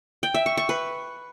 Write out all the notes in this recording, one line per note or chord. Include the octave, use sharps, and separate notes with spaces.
G5
E5
C#6
C#6
B4